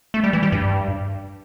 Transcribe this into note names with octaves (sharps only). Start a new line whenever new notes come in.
A3
G3
E3
G3
G2